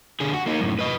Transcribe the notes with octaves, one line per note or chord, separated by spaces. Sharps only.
D3 G#4
F#4
A#3 D#4
F#2 A2
B4 D#5